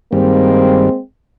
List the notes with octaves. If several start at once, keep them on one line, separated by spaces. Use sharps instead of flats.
G2 D#3 G3 G#3 A#3 C4